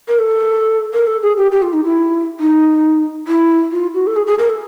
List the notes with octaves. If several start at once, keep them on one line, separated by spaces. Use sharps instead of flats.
A#4
A4
A#4
A4
G#4
G4
G4
F4
D#4
E4
D#4
E4
F4
F#4
A4
G#4
G#4
A#4
A4